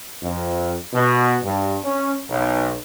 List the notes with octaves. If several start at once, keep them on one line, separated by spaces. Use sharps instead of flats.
F2
B2
G2
C#4
B1